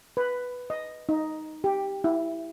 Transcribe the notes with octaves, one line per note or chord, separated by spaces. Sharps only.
B4
D#5
D#4
G4
E4